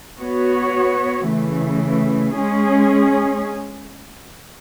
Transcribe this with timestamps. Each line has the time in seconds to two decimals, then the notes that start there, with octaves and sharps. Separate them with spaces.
0.19 B3 F#4 C#5
1.27 C#3 E3 A3
2.36 G#3 C#4 G#4